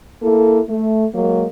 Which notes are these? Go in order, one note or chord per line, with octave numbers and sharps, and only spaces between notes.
A#3 E4 A4
A3
F#3 G#3 A#3